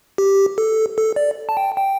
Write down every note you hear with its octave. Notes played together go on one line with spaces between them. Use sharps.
G4
A4
A4
D5
A5
G5
G5